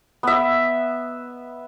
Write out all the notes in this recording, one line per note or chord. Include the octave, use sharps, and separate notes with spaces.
B3 E5